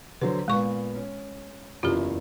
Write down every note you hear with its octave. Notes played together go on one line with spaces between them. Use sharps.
D3 F#3 B4 C5
A#2 G#3 B3 C#6
C#4
F#1 E2 F4 G4